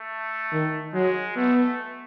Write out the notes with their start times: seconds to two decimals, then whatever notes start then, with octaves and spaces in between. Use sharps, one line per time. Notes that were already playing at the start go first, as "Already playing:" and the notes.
Already playing: A3
0.52 D#3
0.94 F#3 G#3
1.36 A3 B3